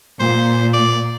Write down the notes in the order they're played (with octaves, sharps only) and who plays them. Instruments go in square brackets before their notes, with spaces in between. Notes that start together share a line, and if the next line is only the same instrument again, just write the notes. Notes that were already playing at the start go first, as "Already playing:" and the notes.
[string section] A#2 [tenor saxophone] C5
[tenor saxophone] D5